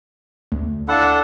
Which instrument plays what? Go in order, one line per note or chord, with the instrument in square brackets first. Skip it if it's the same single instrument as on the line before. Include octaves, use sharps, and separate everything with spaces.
[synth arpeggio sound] D2
[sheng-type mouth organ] D4 A4 F#5 [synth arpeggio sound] E4 F5